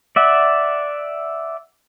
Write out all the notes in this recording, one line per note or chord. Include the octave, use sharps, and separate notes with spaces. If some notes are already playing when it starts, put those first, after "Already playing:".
D5 E5 F#5